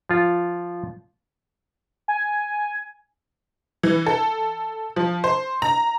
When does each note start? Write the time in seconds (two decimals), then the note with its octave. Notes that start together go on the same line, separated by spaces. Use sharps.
0.09 F3 F4
2.08 G#5
3.83 E3
4.06 A4
4.96 F3
5.24 C5
5.62 A#5